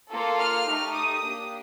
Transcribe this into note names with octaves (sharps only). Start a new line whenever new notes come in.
A#3 F4 A4
F6
A3 D#4 G4
D#6
A#3 D4 G4